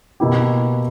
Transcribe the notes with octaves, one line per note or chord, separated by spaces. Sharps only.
B2 A#3 E4 G4